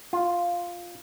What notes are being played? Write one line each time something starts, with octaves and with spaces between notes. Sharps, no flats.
F4